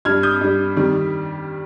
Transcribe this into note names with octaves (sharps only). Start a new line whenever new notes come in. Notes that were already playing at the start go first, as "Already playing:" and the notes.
G2 G3 F6 G#6
D#6 G6
G2 G3
F2 D#3 G3